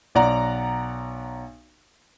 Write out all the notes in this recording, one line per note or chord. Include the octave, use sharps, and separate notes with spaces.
B1 D5 F#5 A#5